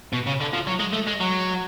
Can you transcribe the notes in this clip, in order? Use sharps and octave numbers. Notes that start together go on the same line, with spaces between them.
B2
C#3
D3
F3
F#3
G#3
A3
G#3
F#3